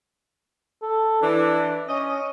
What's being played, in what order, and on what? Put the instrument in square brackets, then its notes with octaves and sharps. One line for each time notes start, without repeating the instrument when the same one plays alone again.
[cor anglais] A4
[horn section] E3 [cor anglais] D4
[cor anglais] C#4 [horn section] D#5